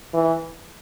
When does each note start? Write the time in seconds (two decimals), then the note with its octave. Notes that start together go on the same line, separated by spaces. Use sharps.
0.14 E3